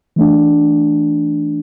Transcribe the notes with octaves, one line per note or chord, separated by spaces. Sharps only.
E3 A3 D4